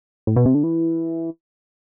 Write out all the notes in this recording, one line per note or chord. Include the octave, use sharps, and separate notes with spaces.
A2
B2
C3
D3
E3